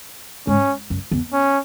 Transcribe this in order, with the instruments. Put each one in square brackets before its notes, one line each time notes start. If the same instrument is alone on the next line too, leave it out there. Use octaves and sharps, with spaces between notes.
[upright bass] G#2 [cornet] C#4
[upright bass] F#2
E2
[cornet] C#4